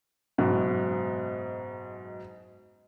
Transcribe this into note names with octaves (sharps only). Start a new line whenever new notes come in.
F#1 G#2 B2